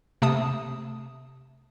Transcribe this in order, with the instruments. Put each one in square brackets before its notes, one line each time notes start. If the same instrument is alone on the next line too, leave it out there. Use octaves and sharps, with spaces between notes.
[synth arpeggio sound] C3 A3 A5 D#6